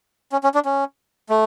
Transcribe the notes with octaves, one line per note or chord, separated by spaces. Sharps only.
C#4
C#4
D4
C#4
A3